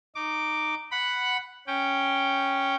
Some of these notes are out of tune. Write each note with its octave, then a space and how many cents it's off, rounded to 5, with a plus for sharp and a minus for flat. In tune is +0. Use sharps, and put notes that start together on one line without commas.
D#4 -10 D6 +0
F#5 +0 B5 +0
C#4 +0 G5 +0